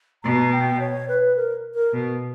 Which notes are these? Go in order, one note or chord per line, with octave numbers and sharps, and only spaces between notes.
B2 A#5
G5
C#5
B4
A#4
A#4
B2